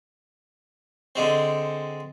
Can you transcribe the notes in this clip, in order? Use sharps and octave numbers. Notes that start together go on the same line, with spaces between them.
D3 G#3 C4